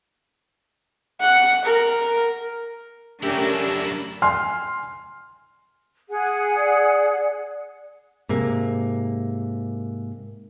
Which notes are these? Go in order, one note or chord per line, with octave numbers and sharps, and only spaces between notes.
F#5
A#4
F#2 A3 C#4 D4 E4 G4 A#4
G#5 C6 F6
G#4 F#5
D5
G#2 C3 A#3